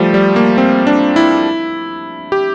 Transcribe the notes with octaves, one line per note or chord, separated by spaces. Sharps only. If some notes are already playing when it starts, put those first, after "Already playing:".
Already playing: F3 G3 A3
G3
A#3
C4
D4
E4
G4